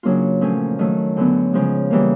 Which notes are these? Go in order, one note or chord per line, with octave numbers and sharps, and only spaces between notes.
C#3 F#3 A#3 D4 F4
A#2 F3 A3 C#4
D#3 F#3 A3
F#2 D3 F#3 B3
C#3 F3 G#3
C#3 E3 G3 A#3